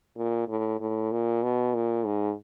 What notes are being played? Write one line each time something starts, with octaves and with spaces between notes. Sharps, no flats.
A#2
A2
A2
A#2
B2
A#2
G#2